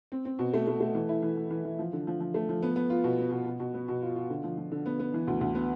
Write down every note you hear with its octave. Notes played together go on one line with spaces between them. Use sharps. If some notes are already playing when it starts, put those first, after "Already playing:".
C4
C4
B2
A3
A3
A3
E3
E4
E3
E3
E3
E3
F3
D3
F3
F3
A3
F3
B3
B3
F4
B2
B3
B2
B2
B2
B3
B2
F4
F4
D3
F3
F3
D3
B3
B3
E3
D2
D2
B3